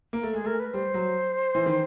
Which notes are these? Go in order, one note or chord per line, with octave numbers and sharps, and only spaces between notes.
A#3
A3
G#3 G#4
A3 A#4
B4
G3 C5
F#3
E3
D#3